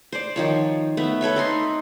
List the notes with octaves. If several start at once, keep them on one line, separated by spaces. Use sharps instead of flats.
C5 D5
D#3 F3 C#5
A3 B3 E5
A4 B4 C#5 E5
C4 D#4 C6